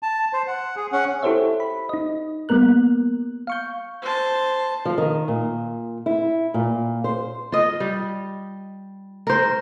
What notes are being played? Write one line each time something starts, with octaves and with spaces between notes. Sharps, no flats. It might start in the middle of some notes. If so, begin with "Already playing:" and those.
A5
C5
F#5
G#4
C#4 F#5
E4 G4 A4 C5 C#5 E5
B5
D#4 D#5
G3 A#3 B3 A#4 F#6
F5 C#6 G6
C5 A5
F3
D#3
A#2
E4
A#2
C5
F4 D#5
G3
A#4 C5